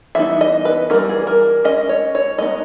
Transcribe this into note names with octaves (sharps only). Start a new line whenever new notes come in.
E3 G3 B3 D#4 E5
D#5
B4
E3 G3 A#3 C#4 A#4
G#4
A#4
G#3 C#4 D#5
C#5
C#5
G#3 B3 D#4 D#5